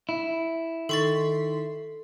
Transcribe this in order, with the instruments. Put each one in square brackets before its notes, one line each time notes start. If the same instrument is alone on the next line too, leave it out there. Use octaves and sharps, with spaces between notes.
[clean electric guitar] E4
[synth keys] D#3 C6 B6 [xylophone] A4 C#6 A6